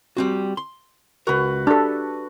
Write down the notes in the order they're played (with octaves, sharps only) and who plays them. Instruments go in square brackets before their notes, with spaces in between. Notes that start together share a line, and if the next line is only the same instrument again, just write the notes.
[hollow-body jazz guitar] G3 C4 F#4
C6
[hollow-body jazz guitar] C#2 A#4 [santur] F#4 B4
[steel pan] D4 A4 [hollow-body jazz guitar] G4